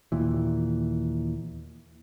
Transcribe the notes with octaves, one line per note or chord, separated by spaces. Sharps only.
D#2 A#2 E3